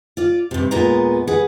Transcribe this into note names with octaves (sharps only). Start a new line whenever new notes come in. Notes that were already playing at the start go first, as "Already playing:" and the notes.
F4 D5
G2 C3
D#2 A#2 G#3 B3 A#5
G#4 B4 F#5